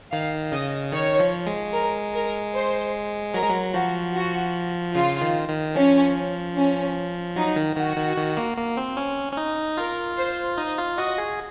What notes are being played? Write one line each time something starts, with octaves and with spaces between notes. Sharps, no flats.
D#3 F5
C#3 D#5
D#3 C#5
F3
G#3
A#4
A#4
C5
F#3 A#4
G#3
F#3
F3 F#4
F#4
C#3 F4
D#3
D#3
F3 C#4
C#4
F#3 D#4
D#3
D#3 F#4
D#3
D#3
A#3
A#3
C4
C#4
C#4
D#4
F4 A#4
C5
D#4 D#5
F4
F#4 D#5
G#4